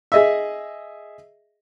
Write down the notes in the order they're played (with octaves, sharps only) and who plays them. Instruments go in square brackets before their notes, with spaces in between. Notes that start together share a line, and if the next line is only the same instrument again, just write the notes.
[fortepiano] G#4 D#5 E5